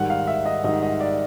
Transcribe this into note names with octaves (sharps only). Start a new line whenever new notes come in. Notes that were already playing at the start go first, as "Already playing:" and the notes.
Already playing: G#2 D#3 G3 F#5
F5
E5
D#5
G#2 D#3 G3 D#5
D#5
D5